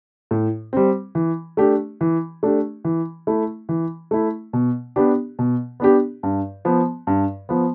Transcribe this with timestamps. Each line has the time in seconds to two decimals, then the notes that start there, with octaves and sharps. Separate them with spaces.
0.31 A2
0.73 G3 C4
1.15 E3
1.57 A3 D4 G4
2.01 E3
2.43 A3 D4 G4
2.85 E3
3.27 A3 E4
3.69 E3
4.11 A3 E4
4.53 B2
4.96 B3 D4 G4
5.39 B2
5.80 B3 D4 G4
6.23 G2
6.65 F3 B3
7.07 G2
7.49 F3 B3